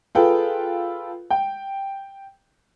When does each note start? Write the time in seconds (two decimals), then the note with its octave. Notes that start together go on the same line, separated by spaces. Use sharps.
0.15 F4 G#4 A4 B4 G5
1.30 G5